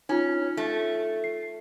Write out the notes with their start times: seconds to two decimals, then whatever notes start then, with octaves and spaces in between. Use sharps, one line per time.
0.09 C#4 D#4 F4
0.57 A3
1.24 C7